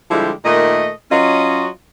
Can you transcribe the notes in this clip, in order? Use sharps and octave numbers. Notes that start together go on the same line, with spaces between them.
D3 F3 G3 G#3 E4 G4
A#2 D#3 A3 D#5
F#3 C#4 F4 F#4 D#5